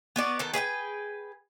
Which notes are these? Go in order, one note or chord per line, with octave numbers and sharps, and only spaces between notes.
B3 F#4 D5
D#3 B3 A4
G#4 B4 F#5 G5